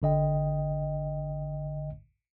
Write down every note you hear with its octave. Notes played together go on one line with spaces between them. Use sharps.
G#1 D3 D#5 G5